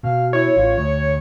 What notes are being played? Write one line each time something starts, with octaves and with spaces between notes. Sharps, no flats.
B2 F5
E4 C#5
A1 F4
D2 C#6